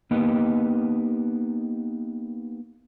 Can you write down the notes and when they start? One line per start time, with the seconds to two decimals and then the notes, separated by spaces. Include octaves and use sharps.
0.11 A#3 B3 D#4 G4 D#5